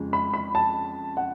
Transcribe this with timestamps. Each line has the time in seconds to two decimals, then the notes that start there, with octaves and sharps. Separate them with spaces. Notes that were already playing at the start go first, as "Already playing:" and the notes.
Already playing: F2 C#3 G#3
0.13 B5
0.34 B5
0.55 A5
1.17 F#5